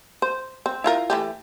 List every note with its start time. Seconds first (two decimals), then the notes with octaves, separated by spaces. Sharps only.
0.22 C5
0.66 C4
0.84 E4 F4 A#4
1.10 E3 A3 G4